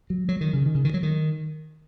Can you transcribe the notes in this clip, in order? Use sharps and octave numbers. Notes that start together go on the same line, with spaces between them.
F#3
F#3
D#3
C#3
D#3
C#3
D#3
F#3
D#3